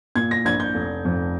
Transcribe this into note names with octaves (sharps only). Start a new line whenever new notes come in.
A#2 G#6
A#6
A#1 G#6
G6
F1
F2